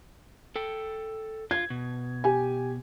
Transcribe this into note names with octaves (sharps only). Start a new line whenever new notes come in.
A4 G5
F4 G#6
B2
G4 G#5